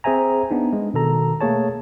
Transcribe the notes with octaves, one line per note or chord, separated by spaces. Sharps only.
C4 G#4 C5 E5 G#5 A#5
B3 D4 D#4
G#3
B2 D#3 A4 A#5
A3 A#3 G#4 C#5 A5